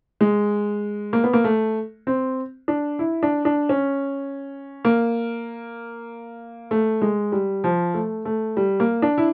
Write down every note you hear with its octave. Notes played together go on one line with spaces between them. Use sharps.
G#3
A#3
B3
A#3
A3
C4
D4
E4
D4
D4
C#4
A#3
A3
G#3
G3
F3
A3
A3
G3
A#3
D4
E4